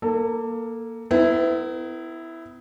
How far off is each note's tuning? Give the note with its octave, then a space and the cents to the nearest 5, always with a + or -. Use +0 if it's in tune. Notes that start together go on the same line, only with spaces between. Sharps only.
A#3 +5 A4 +25
B3 +40 E4 +0 A#4 -15